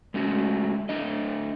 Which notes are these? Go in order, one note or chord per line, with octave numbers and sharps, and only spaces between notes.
G#3 A3 C#4 F#4
A3 D4 D#5